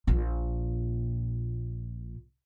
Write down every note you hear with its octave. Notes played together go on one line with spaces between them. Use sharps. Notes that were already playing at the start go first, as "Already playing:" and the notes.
A#1 A#2